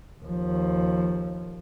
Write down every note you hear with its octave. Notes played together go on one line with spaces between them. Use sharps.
D#2 F3